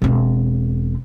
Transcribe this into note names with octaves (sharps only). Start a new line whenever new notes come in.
E1 C4